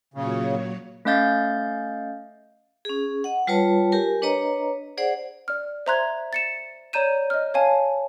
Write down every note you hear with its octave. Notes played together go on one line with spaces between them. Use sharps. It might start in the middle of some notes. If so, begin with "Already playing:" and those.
A#2 C#3 F#3 C#5
A3 C#4 D#5 F5 G6 A6
C#4 G#4
D#5 F#5
G3 F4 B4 C#5 A5
G4 A#4 G#5
D4 B4 C#5 D#5 A#5
G#4 C5 D5 F#5
D5 F6
C5 E5 A#5 C6 F#6 G#6
A6 C#7 E7
C#5 D5 A#5 G6 D#7 E7
D#5 F6
C#5 F5 G#5 A5